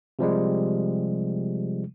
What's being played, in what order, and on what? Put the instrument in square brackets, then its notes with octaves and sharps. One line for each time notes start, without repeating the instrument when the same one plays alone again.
[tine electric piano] C3 F3 G3 G#3